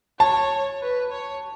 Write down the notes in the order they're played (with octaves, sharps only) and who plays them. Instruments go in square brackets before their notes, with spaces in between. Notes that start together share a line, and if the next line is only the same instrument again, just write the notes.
[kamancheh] C#5 [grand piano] A5
[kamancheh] B4
C#5